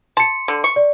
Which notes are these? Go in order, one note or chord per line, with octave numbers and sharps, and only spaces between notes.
A5 C6 C#7
D3
C#6
D5